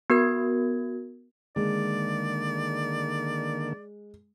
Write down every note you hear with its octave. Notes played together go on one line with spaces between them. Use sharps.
B3 F#4 A#4 G#6
D3 D#3 G#3 A#3 D5